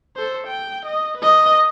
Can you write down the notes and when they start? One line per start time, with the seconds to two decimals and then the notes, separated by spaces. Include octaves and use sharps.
0.16 A4 C5
0.47 G5
0.86 D#5
1.18 B4 D#5